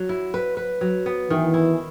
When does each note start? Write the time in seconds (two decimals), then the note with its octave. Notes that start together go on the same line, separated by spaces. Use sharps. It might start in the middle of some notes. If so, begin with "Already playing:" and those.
Already playing: F#3
0.09 E4
0.34 B4
0.57 B4
0.81 F#3
1.06 B3
1.30 D#3 E3
1.54 E4